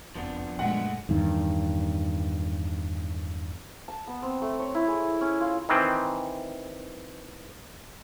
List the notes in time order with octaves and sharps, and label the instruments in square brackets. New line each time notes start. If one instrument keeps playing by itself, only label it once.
[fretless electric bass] F#1 F2 [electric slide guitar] F3 B3 D4
[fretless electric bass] F#2 A#2 [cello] G#3 A3 [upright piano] F#5
[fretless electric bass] E2 G2 D#3
[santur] A5
B3
C4
A3
C#5
E4
G#4
C#4
F4
[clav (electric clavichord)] D#3 E3 C4